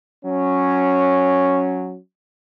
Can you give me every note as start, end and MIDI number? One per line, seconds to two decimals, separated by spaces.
0.24 1.97 54
0.24 1.97 61